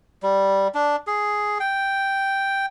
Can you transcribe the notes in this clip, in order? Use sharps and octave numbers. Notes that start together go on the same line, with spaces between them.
G3
D4
G#4
G5